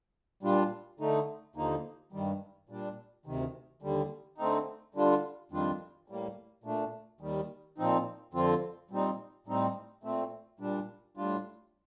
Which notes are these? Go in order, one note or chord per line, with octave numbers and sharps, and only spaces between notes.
A#2 G3 D4 F4
D3 A3 D#4
D#2 D3 F3 A#3 D#4
G2 D#3 G3
A#2 G3 D4
D2 C3 D#3
D#2 D3 G3
D3 A3 C4 D#4
D3 G3 D4 F4
F2 D#3 G3 D4 F4
A2 G3 A#3
A#2 A3 D4
D#2 D#3 G3
A#2 F3 C4 D#4
F2 D3 F3 C4 F4
A#2 G3 C4 D#4
A2 G3 C4 D#4
A#2 A3 C4
A#2 G3 D4
A2 G3 D4 F4